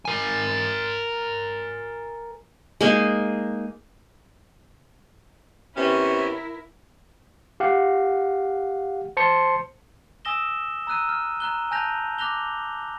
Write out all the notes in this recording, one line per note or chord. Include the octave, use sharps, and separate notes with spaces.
A#4 G#5
G#3 A#3 D#4
C3 B3 C#4 E4 A#4
G4 F5 F#5
C5 A5 C6 C#7
G#5 D#6 E6 A#6 E7 G7
A#5 E6 F#6 D#7
F6
A#5 F#6 G7
G#5 A5 F#6 G6 A#6 F7
D6 F#6 A#6 F7 G7